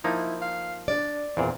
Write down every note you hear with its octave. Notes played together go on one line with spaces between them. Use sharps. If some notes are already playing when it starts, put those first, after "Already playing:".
F3 A#3 D#4 E4
F5
D4 D5
E2 A#2 C4